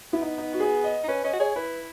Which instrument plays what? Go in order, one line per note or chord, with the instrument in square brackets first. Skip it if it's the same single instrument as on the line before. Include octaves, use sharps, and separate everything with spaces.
[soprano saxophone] B3 [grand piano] E4
[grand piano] D#4
D#4
F#4
G#4
D#5
[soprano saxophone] D#4
[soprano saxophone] C#4 [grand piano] B4
[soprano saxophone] C#4 [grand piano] D#5
[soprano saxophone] F#4
[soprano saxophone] G#4 [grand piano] C#5
[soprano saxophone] E4 [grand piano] B4